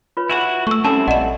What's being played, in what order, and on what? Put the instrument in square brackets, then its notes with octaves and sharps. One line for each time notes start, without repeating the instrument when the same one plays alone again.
[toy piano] F4 B4 C#5
[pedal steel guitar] E4 F#4 F#5 [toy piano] G#4 G#5
[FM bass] A3 [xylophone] C#6 E6
[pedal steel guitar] G3 C4 E4 [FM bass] C#4 [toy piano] A4 G#5 [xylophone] A5
[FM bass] A#1 [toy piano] D5 D#5 [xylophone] F#5 E7